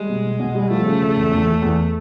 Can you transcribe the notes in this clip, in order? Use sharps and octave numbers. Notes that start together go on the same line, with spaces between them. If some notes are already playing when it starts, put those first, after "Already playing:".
Already playing: G3 G#3
B2
B2
B2
G3
F3 A3
C#3
C#3
E2
E2
E2
E2